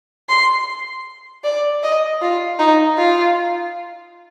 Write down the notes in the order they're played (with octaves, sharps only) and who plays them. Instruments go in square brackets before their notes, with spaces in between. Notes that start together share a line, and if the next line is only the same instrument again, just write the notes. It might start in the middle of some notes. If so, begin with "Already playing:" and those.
[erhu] C6
D5
D#5
F4
D#4
F4